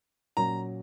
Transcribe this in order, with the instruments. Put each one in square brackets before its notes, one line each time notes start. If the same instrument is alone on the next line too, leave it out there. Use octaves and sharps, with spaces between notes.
[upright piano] A#2 F#3 C#4 [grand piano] A#5